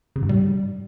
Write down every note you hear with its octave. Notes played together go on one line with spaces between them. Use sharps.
C#3
G#2
G3